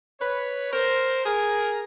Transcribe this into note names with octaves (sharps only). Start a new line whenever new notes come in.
B4 C#5
A#4 C5
G#4 A#4